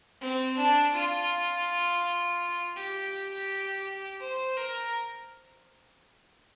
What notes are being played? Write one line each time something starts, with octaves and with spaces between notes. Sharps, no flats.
C4
D4
F4
G4
C5
A#4